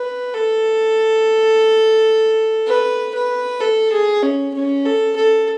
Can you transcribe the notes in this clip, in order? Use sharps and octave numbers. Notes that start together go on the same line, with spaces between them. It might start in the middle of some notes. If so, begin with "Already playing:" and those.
Already playing: B4
A4
B4
B4
A4
G#4
C#4
C#4
A4
A4